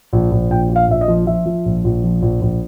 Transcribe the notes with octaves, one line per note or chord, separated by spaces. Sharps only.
A#1
A#1
A#1 G5
A#1
F5
A#1 E5
D#5
F3
F3 E5
F3
A#1
A#1
F3
A#1
A#1